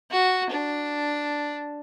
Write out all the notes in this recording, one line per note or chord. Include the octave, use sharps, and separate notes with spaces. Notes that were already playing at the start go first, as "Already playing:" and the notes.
F#4
D4